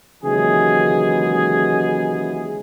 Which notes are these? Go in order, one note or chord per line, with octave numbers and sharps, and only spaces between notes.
D#2 C#3 E3 F#3 G#3 G#4